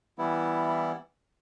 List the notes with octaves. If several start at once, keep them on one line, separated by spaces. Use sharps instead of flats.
E3 G3 B3 E4